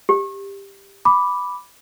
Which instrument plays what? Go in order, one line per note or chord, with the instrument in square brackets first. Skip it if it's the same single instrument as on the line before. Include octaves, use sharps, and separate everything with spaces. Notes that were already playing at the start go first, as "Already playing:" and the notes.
[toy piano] G4
[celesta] B5 D6